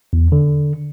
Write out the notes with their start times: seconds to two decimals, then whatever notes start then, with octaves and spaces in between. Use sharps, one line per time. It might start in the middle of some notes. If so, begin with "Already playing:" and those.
0.13 E2
0.32 D3